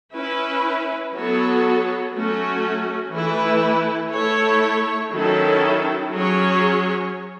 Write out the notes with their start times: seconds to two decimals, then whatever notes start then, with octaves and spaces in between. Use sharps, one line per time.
0.13 C#4 E4 B4
1.13 F#3 B3 F#4 A4 C#5
2.12 F#3 A3 C#4 F#4
3.13 E3 A3 E4 B4
4.12 A3 E4 A4 C#5
5.13 D#3 F#3 C#4 E4 A4
6.12 F#3 C#4 G#4 C#5